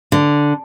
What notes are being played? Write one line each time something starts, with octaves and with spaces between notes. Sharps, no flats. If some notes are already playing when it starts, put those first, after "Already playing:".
D3